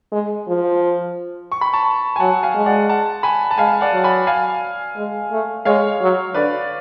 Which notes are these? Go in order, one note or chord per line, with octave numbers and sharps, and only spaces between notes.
G#3
F3
C#6
B5
A5 C#6
G#5
F#3 F#5 A5
F5 G#5
G#3
D5 F#5
F#5 A5
G#5 B5
A5
G#3 F5 G#5
D5 F#5
F#3
G#5 B5
F5 G#5
G#3
A3
G#3 C#5 F5
F#3
D3 B4 D5